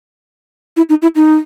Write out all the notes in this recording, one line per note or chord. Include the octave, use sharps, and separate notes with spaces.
E4
D#4
E4
D#4